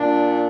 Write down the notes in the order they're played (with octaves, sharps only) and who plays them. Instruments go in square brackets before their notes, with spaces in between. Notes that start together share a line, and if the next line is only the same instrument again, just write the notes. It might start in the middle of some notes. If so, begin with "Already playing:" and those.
Already playing: [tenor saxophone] A#2 [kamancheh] D4